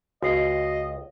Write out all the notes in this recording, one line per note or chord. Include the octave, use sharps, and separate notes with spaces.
C#2 F#4 D#5 C7